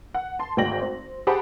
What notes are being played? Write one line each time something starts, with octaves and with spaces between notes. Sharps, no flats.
F#5
A5 C6
G#1 D2 G#3 G5 A#6 F#7
C4
G4 G#4 C5 F#5 A5 B5